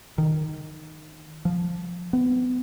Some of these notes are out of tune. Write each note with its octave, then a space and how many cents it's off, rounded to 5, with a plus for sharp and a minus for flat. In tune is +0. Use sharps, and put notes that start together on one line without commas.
D#3 -10
F3 +0
B3 +30